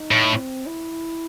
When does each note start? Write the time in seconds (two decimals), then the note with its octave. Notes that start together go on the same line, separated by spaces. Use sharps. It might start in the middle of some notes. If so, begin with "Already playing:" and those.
Already playing: D#4
0.11 A2
0.33 C4
0.66 E4